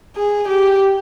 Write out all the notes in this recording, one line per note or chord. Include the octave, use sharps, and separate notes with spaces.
G#4
G4